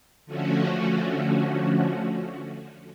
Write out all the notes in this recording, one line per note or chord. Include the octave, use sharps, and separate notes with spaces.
D3 F3 A3 C#4 F#4